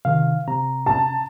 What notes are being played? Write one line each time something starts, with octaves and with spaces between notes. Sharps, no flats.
C3 D#3 F5
C3 A#5
A5